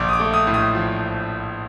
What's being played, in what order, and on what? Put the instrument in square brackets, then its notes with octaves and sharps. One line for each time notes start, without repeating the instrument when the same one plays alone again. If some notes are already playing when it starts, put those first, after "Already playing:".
Already playing: [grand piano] A#1 D6
D#6
D6
A3
D#6
A2
D#6
F3